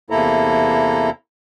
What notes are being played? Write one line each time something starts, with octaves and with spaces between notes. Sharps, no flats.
E2 C3 A#3 E4 A4 A#5